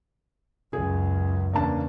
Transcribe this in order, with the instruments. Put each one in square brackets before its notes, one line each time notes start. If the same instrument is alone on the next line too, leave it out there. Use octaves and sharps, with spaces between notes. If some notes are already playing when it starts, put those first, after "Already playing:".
[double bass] C#2 F#2 [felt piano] G#4
[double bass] E2 C#3 [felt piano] A#3 D4 A5